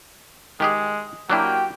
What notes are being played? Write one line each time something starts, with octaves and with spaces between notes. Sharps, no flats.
D#3 G#3 G4 G#4
F#3 A#3 D4 E4 F#4 G4 G5